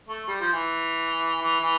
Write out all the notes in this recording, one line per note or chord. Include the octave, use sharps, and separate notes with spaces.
A3
G3
F3
E3
E3
E3